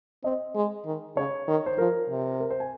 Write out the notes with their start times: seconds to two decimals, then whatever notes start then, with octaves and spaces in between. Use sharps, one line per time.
0.24 C4 D#5
0.55 G#3
0.86 D#3
1.17 C#3 C#5
1.48 D#3
1.66 C5
1.78 F3 A#4
2.09 C3
2.40 A#4
2.50 C5
2.60 G#5